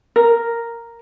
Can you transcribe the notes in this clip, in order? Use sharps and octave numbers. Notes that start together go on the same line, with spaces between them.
A#4